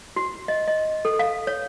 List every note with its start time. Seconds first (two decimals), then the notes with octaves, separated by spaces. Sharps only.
0.16 F#4
0.48 D#5
0.68 D#5
1.05 A4
1.19 F5
1.47 C#5